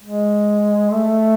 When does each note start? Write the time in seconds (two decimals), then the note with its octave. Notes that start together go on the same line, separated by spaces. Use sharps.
0.03 G#3
0.91 A3